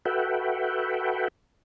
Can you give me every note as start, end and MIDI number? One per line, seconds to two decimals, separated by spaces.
0.05 1.28 66
0.05 1.28 69
0.05 1.28 71
0.05 1.28 76
0.05 1.28 78
0.05 1.28 79